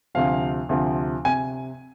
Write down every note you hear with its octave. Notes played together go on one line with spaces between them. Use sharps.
D2 C3 F3 F5
D2 C3 F3
C3 G#5